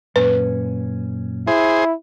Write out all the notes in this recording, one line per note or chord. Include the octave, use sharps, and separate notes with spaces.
F#2 A#2 C#4 B4
E4 G#4 C5